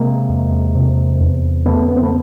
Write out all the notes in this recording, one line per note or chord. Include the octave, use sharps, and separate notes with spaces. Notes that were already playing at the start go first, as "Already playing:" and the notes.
Already playing: C3 G#3 A#3
E2
C3
E2
C#3 A3 B3
B3
C4
A3 B3